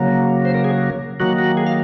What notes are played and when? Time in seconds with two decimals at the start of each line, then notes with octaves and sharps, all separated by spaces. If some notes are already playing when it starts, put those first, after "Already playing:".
Already playing: C#3 F#3 A#3
0.45 C5
0.54 A#4
0.64 G#4
1.20 D#3 F#3 A#3 F#4
1.39 F#4
1.57 G#4
1.67 F5